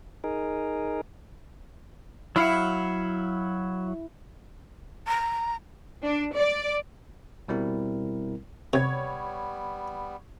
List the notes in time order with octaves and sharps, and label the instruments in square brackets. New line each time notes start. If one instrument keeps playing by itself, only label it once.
[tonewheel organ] D#4 G#4 A#4
[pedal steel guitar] F#3 F5 F#5 [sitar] E4
[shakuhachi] A#5
[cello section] D4
D5
[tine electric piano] B2 G3 C4 E4 A#4
[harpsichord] C3 [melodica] G3 B3 [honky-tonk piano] C#5 G#6